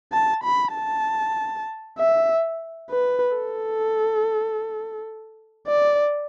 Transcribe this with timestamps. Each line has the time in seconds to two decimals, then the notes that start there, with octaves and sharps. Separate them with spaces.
0.12 A5
0.44 B5
0.75 A5
1.98 E5
2.90 B4
3.36 A4
5.67 D5